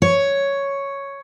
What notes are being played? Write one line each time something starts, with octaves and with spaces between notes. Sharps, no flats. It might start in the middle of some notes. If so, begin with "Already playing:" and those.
C#5